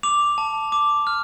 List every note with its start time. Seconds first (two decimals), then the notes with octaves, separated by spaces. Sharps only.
0.03 D6 F7
0.38 A5
0.72 D6
1.07 F6